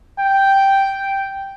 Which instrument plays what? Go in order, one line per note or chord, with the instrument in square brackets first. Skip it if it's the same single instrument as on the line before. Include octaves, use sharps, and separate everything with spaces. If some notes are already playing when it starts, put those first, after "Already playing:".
[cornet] G5